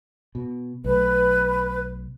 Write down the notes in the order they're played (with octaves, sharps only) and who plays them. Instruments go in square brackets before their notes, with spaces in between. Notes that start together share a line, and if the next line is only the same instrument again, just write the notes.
[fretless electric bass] B2
[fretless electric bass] B1 A3 [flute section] B4